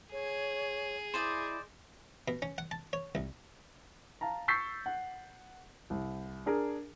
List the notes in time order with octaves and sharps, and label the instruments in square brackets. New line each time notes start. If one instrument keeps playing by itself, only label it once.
[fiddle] G#4 [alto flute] C#5
[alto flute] E4 [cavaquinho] C5 D5 D#5
[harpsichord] B2
C#4
F#5
A5
C#5
C2
[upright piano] F5 A5 A#5
C#6 E6 G6 A6 B6 C7
F#5
C2
D4 G#4 A#4